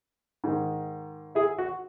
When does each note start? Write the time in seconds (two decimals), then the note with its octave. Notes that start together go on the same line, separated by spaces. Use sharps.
0.44 G#2 D#3
1.35 E4 G#4
1.58 F#4